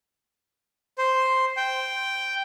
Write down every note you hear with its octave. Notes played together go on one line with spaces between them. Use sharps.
C5
G5